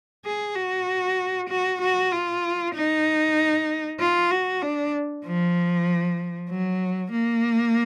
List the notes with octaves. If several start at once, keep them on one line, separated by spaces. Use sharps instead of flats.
G#4
F#4
F#4
F#4
F4
D#4
F4
F#4
D4
F3
F#3
A#3